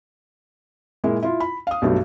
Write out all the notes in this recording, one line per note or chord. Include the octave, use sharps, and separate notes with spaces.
A#2 G#3 A#3 E4
E4 F4
B5
F5 D#6
B1 G2 F#3 A3